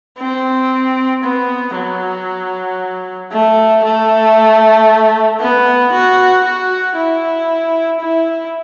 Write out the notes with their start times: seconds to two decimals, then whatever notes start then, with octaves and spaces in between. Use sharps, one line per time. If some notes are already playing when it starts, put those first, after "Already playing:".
0.19 C4
1.24 B3
1.75 F#3
3.32 A3
3.84 A3
5.40 B3
5.93 F#4
6.44 F#4
6.96 E4
8.00 E4